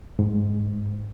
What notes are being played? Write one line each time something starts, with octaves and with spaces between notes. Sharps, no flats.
G#2